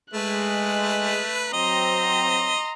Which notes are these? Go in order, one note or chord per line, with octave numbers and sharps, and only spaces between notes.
G#3 A3 B4 F#6
F#3 C4 D#5 A#5 C6